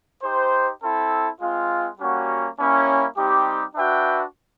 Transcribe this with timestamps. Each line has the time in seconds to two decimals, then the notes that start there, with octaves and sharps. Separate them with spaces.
0.23 D#4 G4 C5
0.80 C4 E4 A4
1.40 G#3 C4 F4
1.98 G3 A#3 C#4 F#4
2.57 G3 A#3 C#4 E4
3.16 G3 C4 D#4 G4
3.75 D4 F#4 B4 E5 G5